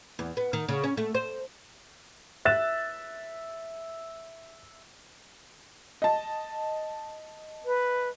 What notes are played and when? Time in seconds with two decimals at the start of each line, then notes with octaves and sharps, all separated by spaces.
0.19 E2
0.37 B3
0.53 D#3
0.69 C#3
0.84 C#4
0.97 A3
1.14 C5
2.45 E5 F#6 A6 E7
6.02 D#5 A5
7.65 B4